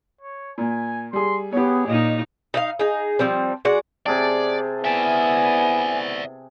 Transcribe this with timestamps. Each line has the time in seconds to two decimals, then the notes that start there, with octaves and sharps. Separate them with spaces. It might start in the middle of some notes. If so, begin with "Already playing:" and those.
0.21 C#5
0.58 A#2 G#5
1.13 G3 G#4 C6
1.53 B3 G4 G#4 C#5
1.87 A#2 D#4 D#5
2.54 D#4 E5 F5
2.79 D#4 G#4
3.19 F3 G3 C4
3.65 G#3 F#4 D5
4.06 C3 G#4 D5 A5
4.84 B3 E4 D5 E5 G#5